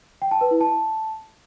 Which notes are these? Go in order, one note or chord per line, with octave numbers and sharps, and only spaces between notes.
G5
A5
B4
E4
A5